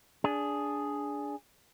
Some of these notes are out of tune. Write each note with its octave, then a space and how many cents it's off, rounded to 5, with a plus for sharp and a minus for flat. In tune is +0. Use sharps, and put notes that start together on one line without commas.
D4 -15 G#4 +0